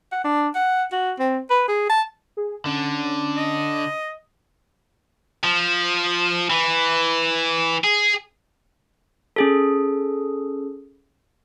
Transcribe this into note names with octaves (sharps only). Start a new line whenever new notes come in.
F#5
D4
F#5
F#4
C4
B4
G#4
A5
G#4
D3 C#4
D#5
F3
E3
G#4
C#4 G#4 A4